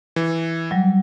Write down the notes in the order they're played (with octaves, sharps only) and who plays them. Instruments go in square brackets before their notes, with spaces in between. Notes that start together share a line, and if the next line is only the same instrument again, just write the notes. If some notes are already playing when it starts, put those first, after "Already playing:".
[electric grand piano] E3
[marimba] F#3 G3